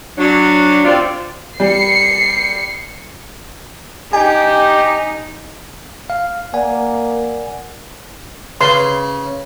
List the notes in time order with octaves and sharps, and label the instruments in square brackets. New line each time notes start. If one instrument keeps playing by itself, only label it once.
[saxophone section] F#3 D4
C3 C4 F4 D5
[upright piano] G3 [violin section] C7 C#7
[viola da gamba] D#4 [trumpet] G4 [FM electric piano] G#5
[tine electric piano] F5
[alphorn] A#3 [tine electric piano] D5 F#5 G#5
[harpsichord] C#3 [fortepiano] B4 [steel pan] C6